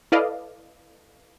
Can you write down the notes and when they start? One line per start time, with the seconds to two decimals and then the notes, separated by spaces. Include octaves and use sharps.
0.12 E4 A4 B4 D5 D#5 F5